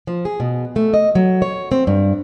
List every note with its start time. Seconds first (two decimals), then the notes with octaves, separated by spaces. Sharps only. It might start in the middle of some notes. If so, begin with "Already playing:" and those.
0.07 F3
0.25 G#4
0.40 B2
0.76 A3
0.94 D#5
1.15 F#3
1.42 C#5
1.72 C4
1.87 G2